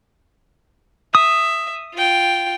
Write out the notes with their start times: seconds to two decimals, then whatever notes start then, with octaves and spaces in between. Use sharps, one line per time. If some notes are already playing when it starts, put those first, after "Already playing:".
1.15 E5 D#6
1.94 F4 G5